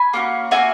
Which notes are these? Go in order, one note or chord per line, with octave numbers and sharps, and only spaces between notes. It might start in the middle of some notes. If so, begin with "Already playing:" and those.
Already playing: G#5 B5
A#3 C#4 F#4
A#3 D#4 F#4 E5 G#5